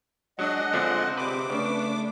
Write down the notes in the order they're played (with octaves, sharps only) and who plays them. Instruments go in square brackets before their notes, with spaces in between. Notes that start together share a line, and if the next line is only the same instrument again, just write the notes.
[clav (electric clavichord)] F#3 [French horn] G#3 [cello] D4 [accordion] D#5 F#5
[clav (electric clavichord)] D3 F3 D4 [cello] C4
[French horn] C3 [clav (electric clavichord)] B4 [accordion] D6
[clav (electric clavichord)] C#3 [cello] A3 D4 [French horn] B4